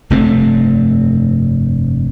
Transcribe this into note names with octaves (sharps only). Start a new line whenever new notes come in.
F1 G2 A3 C4